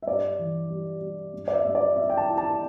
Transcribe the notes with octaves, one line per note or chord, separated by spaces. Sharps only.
E5
G2 D5
E3
G3
G3
G2
D5
E5
G2
D5
C4 E5
G5
A5
E4
A5